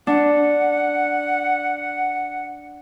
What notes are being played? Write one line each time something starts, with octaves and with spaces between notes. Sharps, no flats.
D4 F#5